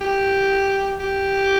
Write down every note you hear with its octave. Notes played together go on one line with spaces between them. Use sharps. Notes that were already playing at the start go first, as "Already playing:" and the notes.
G4
G4